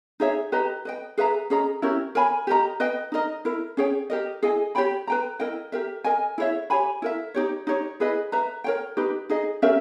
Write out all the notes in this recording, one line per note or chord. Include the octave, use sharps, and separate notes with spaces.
D#4 G#4 C#5 E5
G4 B4 D#5 A#5
B4 D#5 G5
G#4 B4 E5 A#5
C#4 G#4 D#5 A#5
C#4 E4 G4 A#4
A#4 C#5 G#5 B5
G4 A#4 D#5 A#5
B4 D#5 G5
D#4 A#4 D#5
E4 A#4 E5
C#4 G#4 C#5 G5
G4 A#4 D#5
E4 G#4 D#5 G#5
G4 C#5 G5 B5
B4 G5 A#5
E4 A#4 D#5 G5
G4 A#4 E5
A#4 D#5 G#5
E4 G#4 C#5 E5
G4 C#5 G#5 B5
E4 A#4 E5
D#4 G4 C#5
D#4 G4 C#5
E4 G#4 B4 D#5
B4 E5 A#5
A#4 C#5 G5
D#4 G4 B4
D#4 G#4 D#5
C#4 G4 A#4 E5